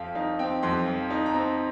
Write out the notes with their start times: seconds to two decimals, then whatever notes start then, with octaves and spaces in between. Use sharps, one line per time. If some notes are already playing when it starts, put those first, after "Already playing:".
Already playing: F2 F3 F5 G5
0.15 D#4 F5
0.39 C4 G5
0.63 F2 C6
0.86 F3
1.10 D#4
1.26 A#5
1.34 C4